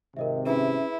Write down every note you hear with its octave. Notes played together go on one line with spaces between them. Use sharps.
G#1 C3 A#4 D#5 E5
C#4 E4 G#4 B4 E5